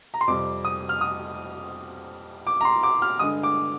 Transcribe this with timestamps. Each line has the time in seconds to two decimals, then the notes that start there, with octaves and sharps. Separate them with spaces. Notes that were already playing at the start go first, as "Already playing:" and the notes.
0.14 A#5
0.21 C6
0.28 F2 C3 G3 D6
0.65 D#6
0.89 F6
1.01 D#6
2.47 D6
2.61 A#5
2.65 C6
2.83 D6
3.02 F6
3.19 G2 D3 G#3 D#6
3.43 D6